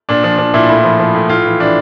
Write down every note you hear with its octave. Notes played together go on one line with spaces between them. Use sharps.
A#2 D4
F3 D4
F3 D4
A#2 E4
A2 E4
F3
F3
A2
A2 F4
E3
E3 D4